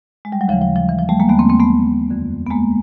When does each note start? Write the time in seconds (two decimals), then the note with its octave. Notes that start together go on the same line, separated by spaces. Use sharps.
0.25 G#3
0.32 G3
0.41 F#3
0.48 D#2 C#3 E3 F3
0.61 F3
0.76 F3
0.89 E3
0.99 F3
1.09 G3 A3
1.20 G#3 A#3
1.29 D#2 D3 A3 B3
1.39 A#3 C4
1.49 A#3 C4
1.60 A3 B3
2.11 F2 D3
2.47 B3
2.50 G#3 A#3